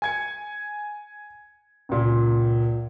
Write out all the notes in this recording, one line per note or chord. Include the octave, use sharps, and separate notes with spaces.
G#5 G#6 C#7
C#2 A#2